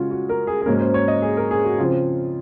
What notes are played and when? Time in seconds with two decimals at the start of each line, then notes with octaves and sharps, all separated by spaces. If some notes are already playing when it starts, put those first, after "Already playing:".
Already playing: C#3 G#3 C#4 F4 F#4
0.11 F#4
0.29 A#4
0.47 G#4
0.61 G#4
0.66 G#2 F#3 A#3 C#4 A#4
0.80 C5
0.94 C#5
1.08 D#5
1.22 G#4
1.37 A#4
1.51 G#4
1.65 F#4
1.78 C#3 F3 C4 F4